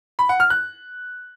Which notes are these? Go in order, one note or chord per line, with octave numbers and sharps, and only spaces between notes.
B5
F#5
F6
F#6